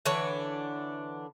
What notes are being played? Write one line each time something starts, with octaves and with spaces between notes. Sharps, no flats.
D3 E3 D4 C#5